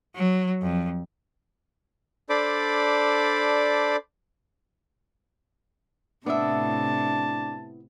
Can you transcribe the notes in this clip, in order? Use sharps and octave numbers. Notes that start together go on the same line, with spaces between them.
F#3
F2
D4 A4 C5 D5 B5 D6
A2 C3 B3 D4 E4 E5 A5